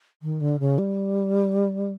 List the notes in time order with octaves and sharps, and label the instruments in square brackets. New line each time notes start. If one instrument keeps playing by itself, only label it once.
[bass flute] D#3
D3
C#3
G3